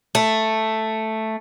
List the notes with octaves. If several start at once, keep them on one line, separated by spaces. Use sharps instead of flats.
A3